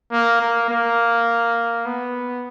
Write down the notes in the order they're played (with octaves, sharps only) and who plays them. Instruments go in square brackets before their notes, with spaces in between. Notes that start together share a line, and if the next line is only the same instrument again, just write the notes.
[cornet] A#3
A#3
A#3
B3